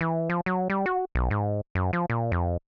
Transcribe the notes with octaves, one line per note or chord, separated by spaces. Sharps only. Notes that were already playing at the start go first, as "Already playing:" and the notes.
E3
F3
F#3
G3
F#4
B1
G#2
F#2
F3
A#2
F2